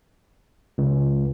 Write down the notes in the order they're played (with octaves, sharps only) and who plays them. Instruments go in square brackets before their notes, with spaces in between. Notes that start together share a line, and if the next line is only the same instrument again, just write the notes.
[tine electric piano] C#2